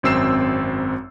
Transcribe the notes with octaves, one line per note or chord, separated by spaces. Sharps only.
G#1 F#2 C4 E6 C7 E7